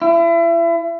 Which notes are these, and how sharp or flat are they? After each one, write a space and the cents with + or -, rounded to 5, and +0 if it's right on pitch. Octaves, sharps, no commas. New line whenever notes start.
E4 +35